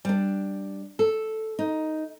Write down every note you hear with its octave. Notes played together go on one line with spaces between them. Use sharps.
G3 D4
A4
D#4